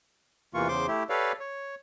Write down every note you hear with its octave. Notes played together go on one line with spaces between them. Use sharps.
E2 C3 E3 A#3 F4 C#6
E2 C#3 C5 C6 D6
A3 E4 G4
G4 A4 B4 C#5 D5 F5
C#5